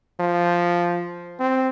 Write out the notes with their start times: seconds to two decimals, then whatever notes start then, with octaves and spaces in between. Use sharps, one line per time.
0.20 F3
1.40 C4